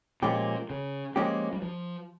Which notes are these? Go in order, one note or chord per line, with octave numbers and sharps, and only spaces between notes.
A#2 F3 G#3 C#4 G4
C#3
F3 G#3 A#3 C#4 G4
G3
F3